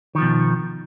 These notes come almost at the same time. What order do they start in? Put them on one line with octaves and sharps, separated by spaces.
D#3 F3 B2